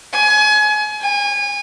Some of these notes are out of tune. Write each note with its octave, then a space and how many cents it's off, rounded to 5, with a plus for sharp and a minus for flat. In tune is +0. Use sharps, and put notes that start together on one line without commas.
G#5 +30
G#5 -30